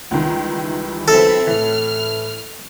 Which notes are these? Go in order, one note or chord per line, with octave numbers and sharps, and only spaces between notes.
C#2 D#3 E3 G3
B1 C4 E4 A4 B4 E5
A2 E3 F6